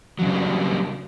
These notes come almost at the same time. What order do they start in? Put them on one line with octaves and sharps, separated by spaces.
F#3 C#3 G3 D4 A#3